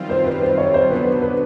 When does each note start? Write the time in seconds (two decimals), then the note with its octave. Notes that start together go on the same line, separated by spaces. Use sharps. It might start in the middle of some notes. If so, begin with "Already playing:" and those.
Already playing: F#2 D#3 G3 C4 F4
0.10 C5
0.25 B4
0.42 C5
0.58 C#5
0.74 C5
0.89 D3 F#3 B3 D4 B4
1.22 B4